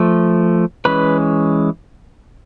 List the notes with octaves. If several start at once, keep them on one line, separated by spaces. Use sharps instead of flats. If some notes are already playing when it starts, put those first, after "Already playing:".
Already playing: F3 A3
E3 G#3 C#4 B4 B5